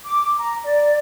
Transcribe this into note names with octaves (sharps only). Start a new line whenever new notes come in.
D6
A#5
D5